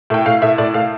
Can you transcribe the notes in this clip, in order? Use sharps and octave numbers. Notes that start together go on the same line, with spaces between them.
A2 G5
A2 F5
A2 E5
A2 D5
A2 F5